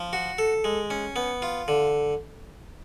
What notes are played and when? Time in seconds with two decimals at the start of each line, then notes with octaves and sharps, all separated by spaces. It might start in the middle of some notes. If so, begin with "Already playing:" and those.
Already playing: F3
0.13 F#4
0.38 A4
0.64 G#3
0.90 C#4
1.16 B3
1.42 F4
1.68 D3